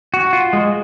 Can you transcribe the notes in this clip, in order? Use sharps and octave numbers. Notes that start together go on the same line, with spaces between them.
F#4
F4
G#3